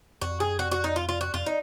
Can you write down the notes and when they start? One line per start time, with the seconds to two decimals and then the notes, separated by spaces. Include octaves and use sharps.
0.21 F2 F#4
0.40 F#2 G#4
0.58 F2 F#4
0.71 F#4
0.84 D#4
0.96 F4
1.09 F4
1.21 F#4
1.34 F2 F4
1.46 D#4